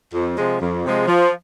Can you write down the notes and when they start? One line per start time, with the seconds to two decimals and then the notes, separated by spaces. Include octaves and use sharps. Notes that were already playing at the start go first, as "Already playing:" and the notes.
0.14 F2
0.38 C3 F3 G#3
0.61 F2
0.85 C3 F3 G#3
1.08 F3